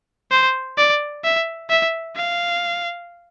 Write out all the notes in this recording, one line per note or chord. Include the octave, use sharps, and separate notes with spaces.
C5
D5
E5
E5
F5